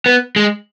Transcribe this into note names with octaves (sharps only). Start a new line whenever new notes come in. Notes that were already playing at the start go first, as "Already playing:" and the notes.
B3
G#3